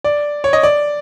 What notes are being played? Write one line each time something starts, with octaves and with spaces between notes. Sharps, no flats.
D5
C#5
D#5
D5